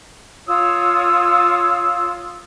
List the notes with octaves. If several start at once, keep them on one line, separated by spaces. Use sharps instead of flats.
F4 C#5 D#6 E6